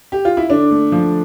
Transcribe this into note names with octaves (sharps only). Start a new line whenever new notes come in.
G4
F4
E4
D3 D4
A3
F3